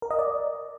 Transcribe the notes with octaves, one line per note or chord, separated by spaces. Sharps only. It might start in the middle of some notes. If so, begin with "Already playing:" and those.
A#4
D#5
D5